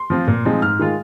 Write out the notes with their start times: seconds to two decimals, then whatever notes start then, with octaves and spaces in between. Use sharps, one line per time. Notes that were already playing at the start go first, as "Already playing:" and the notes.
Already playing: C6
0.10 F3 C4 F4
0.27 A#2
0.45 F3 G#3 C4 D#4
0.62 G#2 F6
0.79 D#3 G#3 F4